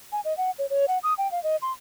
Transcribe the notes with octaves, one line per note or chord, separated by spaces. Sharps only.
G#5
D#5
F#5
C#5
C#5
F#5
D#6
G5
F5
D#5
C6